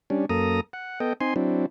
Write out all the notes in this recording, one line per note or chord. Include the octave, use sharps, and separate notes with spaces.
G3 C#4 D4
F#2 A#3 A4 A#5 D#6
F#5
B3 A4 D#5 G5
C4 D#4 G#5 C6
F#3 C4 D4 E4